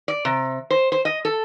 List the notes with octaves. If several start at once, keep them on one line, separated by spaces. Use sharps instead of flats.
D5
C3
C5
C5
D#5
A4